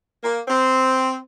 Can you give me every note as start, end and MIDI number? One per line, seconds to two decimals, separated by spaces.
0.24 0.40 58
0.48 1.17 60